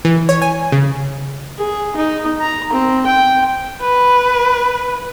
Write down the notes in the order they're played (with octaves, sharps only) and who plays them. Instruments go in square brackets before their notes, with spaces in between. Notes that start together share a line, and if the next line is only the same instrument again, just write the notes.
[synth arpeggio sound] E3
C#5
G#5
C#3
[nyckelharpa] G#4
D#4
A#5
C4
G5
[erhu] B4